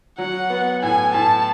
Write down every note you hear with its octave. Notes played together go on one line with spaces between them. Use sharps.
F#3 F#5
B3
A2 G#5
A2 A5